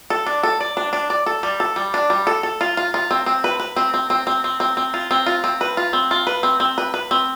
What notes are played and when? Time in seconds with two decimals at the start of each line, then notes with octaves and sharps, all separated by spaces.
0.10 A4
0.26 D4
0.43 A4
0.61 D5
0.77 D4
0.93 D4
1.10 D5
1.26 A4
1.43 G3
1.60 A4
1.76 G3
1.94 D4
2.10 G3
2.27 A4
2.43 A4
2.61 F4
2.77 F4
2.94 F4
3.11 C4
3.26 C4
3.44 B4
3.60 B4
3.76 C4
3.94 C4
4.10 C4
4.27 C4
4.44 C4
4.60 C4
4.77 C4
4.94 F4
5.11 C4
5.26 F4
5.44 C4
5.61 B4
5.77 F4
5.93 C4
6.11 F4
6.27 B4
6.43 C4
6.60 C4
6.78 B4
6.94 B4
7.11 C4